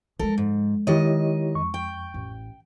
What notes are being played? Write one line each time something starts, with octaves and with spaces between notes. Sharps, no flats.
F3 G#3 A4 A#4
G#2
D#3 E4 G4 C#5 D#5
F2 C#6
G5
A1